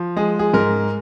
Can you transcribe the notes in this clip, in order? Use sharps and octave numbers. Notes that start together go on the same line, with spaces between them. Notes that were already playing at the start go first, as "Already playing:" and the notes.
Already playing: F3
G#3 G#4
G#4
G#2 A#4